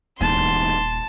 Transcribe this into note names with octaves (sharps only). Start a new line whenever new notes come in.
D#1 E2 G#2 A5 C6